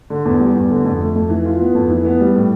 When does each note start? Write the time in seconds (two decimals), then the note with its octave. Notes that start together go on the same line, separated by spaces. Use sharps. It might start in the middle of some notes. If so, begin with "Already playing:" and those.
0.10 D3
0.25 E2
0.40 G3
0.55 E2
0.70 D3
0.85 F2
1.00 A3
1.15 F2
1.30 E3
1.45 F4
1.60 B3
1.75 F2
1.90 E3
2.05 B3
2.20 G3
2.35 A2